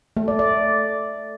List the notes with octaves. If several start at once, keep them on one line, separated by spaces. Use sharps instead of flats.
A3
D5
D5